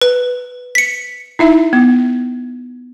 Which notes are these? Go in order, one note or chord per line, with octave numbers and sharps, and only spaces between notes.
B4
B6 C#7
D#4 E4 E5
B3